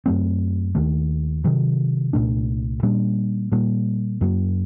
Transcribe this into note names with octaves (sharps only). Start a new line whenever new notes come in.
F#2 F#3 A3 C4
D#2 D#3 A3
C3 D#3 F#3
C2 A#2 A3 D4
A#2 G3 A#3 D4
A#2 G3 A#3
F#2 F#3 A#3